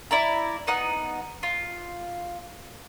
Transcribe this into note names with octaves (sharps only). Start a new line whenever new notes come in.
E4 D5 A#5
B3 D#4 F#5
F4